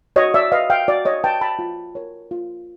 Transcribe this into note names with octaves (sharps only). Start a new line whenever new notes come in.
F#4 C#5 D#5
D5 E5
B4 D#5 F5
F5 G5
F#4 D5
C#5 D#5
B4 G5 A5
A5 B5
F4
A#4 C#5
F4